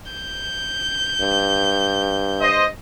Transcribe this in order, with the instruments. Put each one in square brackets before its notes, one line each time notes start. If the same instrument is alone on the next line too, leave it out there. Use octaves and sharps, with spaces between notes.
[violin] G6
[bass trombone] G2
[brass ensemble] C5 D#5